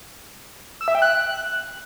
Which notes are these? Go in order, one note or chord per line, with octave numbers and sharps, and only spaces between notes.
E6
E5
G5
F#6